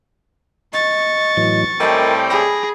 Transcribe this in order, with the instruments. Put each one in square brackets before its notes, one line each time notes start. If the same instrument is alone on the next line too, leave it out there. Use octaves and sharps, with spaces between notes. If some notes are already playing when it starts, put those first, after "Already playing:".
[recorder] D#5 [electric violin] C#6 A6
[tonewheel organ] A2 E3 F#3
[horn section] A2 G3 C4 [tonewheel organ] A#4 G#5 [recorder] D#5
[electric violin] G#4 [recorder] B5 [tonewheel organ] A#6